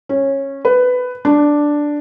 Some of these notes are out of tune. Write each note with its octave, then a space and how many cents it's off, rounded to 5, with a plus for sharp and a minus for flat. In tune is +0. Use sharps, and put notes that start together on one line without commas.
C#4 -15
B4 +15
D4 +0